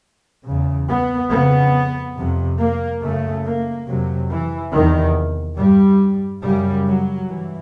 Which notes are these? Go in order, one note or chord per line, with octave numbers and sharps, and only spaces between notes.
E2 C#3
B3
F2 C#3 B3
F2 C3
A#3
F#2 C#3 A3
A#3
F2 C3 F#3
E3
E2 C3 D#3
G2 G3
F#2 C#3 G3
F#3
G2 E3